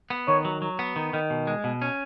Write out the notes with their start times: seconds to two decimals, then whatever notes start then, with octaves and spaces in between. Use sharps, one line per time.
0.10 B3
0.28 D#3 C#5
0.45 F#3
0.62 F#3
0.79 B3
0.96 D#3
1.13 D#3
1.30 B2
1.47 G#3
1.64 B2
1.82 C#4